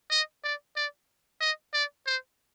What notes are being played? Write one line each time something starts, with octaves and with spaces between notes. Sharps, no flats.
D#5
D5
D5
D#5
D5
C5